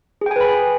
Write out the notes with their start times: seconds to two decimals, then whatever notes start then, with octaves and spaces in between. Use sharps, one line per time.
0.21 G#4
0.26 G5
0.31 G#5
0.36 B4
0.41 B5